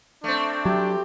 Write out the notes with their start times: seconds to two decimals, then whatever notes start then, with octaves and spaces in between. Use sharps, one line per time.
0.24 A3 C4 D4
0.65 F#3 G4